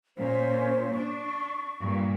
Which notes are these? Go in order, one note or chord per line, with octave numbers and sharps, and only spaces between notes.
A#2 C#4 C5
D4 C#6
G2 A#2